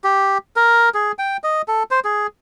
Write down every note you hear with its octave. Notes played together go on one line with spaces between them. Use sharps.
G4
A#4
G#4
G5
D#5
A4
C5
G#4